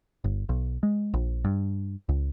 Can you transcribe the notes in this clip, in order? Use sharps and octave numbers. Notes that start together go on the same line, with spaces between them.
G1
B1
G#3
A#1
G2
C#2